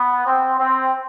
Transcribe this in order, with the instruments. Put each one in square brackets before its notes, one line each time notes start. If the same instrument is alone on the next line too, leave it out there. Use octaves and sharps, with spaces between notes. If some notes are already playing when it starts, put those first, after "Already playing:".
Already playing: [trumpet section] B3
C4
C4